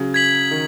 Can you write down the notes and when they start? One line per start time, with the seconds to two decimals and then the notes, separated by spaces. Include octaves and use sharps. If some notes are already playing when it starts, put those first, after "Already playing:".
Already playing: C#3 F#3
0.14 G#6 B6 F#7
0.51 D#3